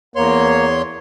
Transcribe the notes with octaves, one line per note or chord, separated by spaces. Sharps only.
E2 A#3 C#5 C6